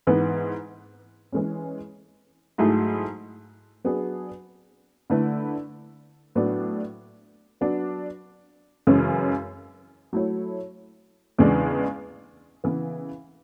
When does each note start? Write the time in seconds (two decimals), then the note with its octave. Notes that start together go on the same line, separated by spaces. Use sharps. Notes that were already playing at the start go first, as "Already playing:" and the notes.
0.07 G#2 E3 B3
1.32 E3 G#3 C#4
2.58 G#2 F#3 A3 E4 G#4
3.84 F#3 B3 D4 G#4
5.10 D3 A3 E4 B4
6.35 A2 F#3 B3 D4
7.61 F#3 B3 D4
8.87 F#2 C#3 E3 G#3 C#4
10.13 F#3 A3 E4 A4 C#5
11.38 E2 C#3 E3 G#3 D4
12.64 C#3 E3 B3